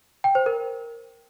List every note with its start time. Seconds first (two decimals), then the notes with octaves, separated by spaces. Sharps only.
0.24 G5
0.35 C5
0.46 A#4